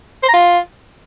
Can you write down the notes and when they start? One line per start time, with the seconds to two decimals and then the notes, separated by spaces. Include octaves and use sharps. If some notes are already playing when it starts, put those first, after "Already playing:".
0.23 C5
0.28 A#5
0.34 F4